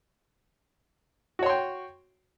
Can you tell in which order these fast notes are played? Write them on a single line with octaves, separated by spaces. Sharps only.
F#4 C#5 C6 G5